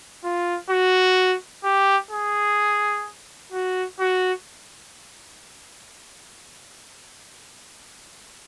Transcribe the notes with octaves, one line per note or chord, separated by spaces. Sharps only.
F4
F#4
G4
G#4
F#4
F#4